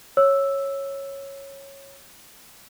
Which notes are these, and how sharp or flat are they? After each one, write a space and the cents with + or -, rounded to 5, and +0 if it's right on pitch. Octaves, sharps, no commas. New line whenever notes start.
C#5 -10 E6 +0